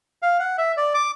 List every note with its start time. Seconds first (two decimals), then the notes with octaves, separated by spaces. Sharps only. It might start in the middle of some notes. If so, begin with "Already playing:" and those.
0.22 F5
0.40 F#5
0.58 E5
0.77 D5
0.94 D6